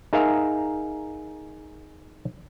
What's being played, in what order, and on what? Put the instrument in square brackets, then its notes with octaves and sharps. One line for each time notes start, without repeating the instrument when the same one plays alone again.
[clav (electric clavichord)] D#4 G#4 A#4 E5 F5